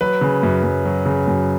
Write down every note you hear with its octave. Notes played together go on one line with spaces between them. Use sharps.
F#3 B4
C#3
F#2
F#2
F#3
C#3
F#2